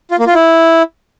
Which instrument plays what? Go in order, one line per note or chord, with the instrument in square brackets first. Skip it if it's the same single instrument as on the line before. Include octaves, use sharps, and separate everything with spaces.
[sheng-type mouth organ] F4
A#3
F4
E4